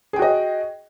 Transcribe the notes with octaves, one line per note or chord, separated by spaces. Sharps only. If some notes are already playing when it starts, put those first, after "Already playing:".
F#4 G#4 D#5 G5